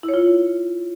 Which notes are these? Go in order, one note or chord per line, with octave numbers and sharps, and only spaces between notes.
E4
C#5
F4